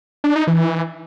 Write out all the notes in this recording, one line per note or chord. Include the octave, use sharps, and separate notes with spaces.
D4
D#4
E3